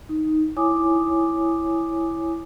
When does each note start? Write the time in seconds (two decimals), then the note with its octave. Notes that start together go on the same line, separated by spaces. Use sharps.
0.09 D#4
0.56 E4 C#5 G#5 D6 D#6